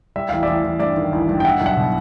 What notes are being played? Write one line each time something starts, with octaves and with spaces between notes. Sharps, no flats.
G3 E5
A1 F5
D5 E5
A1
A1
G2 D5 E5
D#3
A1
G2
G5
G3 E5 F#5
B1
E5 F#5
B2